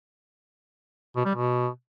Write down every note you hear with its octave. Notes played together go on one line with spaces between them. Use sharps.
B2
G3
B2